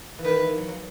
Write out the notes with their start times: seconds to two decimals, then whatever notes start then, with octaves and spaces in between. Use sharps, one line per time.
0.19 E3
0.24 D#3 B4
0.35 E3
0.47 E3
0.58 F#3
0.69 F#3